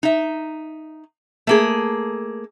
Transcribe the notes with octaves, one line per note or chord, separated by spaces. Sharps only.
D#4 E5
A3 A#3 G#4